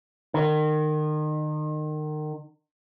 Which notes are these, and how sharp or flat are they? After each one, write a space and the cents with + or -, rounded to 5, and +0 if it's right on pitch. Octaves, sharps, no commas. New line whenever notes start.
D#3 -30